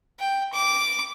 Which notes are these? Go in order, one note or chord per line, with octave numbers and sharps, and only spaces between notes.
G5
D6